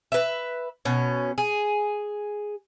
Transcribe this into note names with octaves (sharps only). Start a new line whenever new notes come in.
B4 E5
B2 C#4
G#4